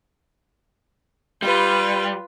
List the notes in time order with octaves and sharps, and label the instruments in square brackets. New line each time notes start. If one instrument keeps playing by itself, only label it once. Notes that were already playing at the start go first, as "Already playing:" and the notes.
[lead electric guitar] G3 [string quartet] F4 B4